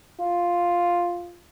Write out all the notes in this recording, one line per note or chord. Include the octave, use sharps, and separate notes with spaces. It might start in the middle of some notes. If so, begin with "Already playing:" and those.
F4